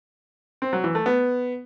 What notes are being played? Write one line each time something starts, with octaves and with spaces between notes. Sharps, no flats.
C4
F#3
E3
A3
B3